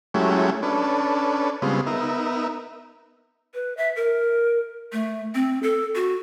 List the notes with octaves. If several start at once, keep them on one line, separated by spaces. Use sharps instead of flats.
F#3 G#3 A3 C#4 E4 G4
C#4 D4 A4 B4
C#3 G3 G#3 B3 C4 F4
B3 D#4 A#4 E5
B4
E5
A#4
A3
C4
A4
F#4